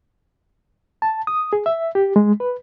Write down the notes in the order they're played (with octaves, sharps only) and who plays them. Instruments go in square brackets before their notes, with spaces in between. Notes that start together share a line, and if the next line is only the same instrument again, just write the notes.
[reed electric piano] A5
D#6
G#4
E5
G4
G#3
B4